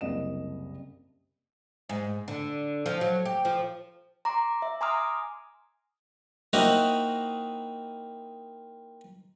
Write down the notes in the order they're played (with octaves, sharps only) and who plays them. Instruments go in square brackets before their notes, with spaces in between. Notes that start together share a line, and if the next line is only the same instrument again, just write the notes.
[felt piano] F#1 C2 D#5 E7
[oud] G#2
D3
F3
F#3
G4
F3
[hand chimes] A#5 C6 D6
E5
G#5 A#5 C6 D6 D#6 F6
[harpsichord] A#3 C4 D#4 E4 F#4 D#5